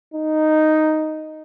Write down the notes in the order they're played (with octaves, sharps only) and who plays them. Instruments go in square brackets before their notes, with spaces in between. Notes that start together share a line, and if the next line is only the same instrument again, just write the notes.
[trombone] D#4